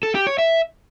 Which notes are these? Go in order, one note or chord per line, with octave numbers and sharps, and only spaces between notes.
A4
G4
C#5
E5